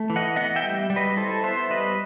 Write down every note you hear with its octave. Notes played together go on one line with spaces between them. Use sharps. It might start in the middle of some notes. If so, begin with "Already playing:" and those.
Already playing: A3
E3
D#5 F#5
B3 D#5 F#5
E5 G5
G3
G3
B4 D#5
E4 A4 C5
B3 C5 E5
G3 B4 D#5